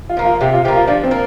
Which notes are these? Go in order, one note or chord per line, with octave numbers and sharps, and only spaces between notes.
F4
F3 A#3
F4
C3 G4
F4
F3 A#3 G4
F4
F3 D4
C4
A#3